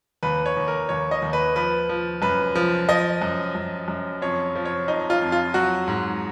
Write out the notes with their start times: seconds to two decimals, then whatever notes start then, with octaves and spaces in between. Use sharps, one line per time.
0.23 D#2 B4
0.46 C#5
0.57 D#2
0.68 A#4
0.89 D#2 C#5
1.11 D#5
1.22 D#2
1.33 B4
1.56 F3 B4
1.89 F3
2.22 F#2 B4
2.56 F3
2.89 F3 D#5
3.22 F#2
3.55 F#2
3.88 F#2
4.22 F2 C#5
4.55 F3
4.65 C#5
4.88 F2 D#4
5.10 F4
5.22 F2
5.32 F4
5.54 F#3 F#4
5.88 G#2